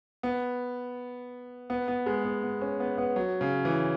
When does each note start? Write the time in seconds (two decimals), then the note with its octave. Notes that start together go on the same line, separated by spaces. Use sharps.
0.23 B3
1.70 B3
1.88 B3
2.06 G#3
2.25 B3
2.43 B3
2.61 C#4
2.80 B3
2.98 B3
3.16 F#3
3.41 C#3
3.65 E3